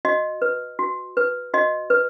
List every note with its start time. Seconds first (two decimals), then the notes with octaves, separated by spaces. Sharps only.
0.05 F#4 D#5
0.42 B4
0.79 F#4
1.17 B4
1.54 F#4 D#5
1.90 B4